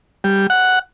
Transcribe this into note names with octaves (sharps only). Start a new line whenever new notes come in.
G3
F#5